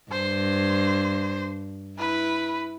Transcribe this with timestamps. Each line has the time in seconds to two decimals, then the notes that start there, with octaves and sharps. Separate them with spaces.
0.11 G2 C5
1.98 E4 B4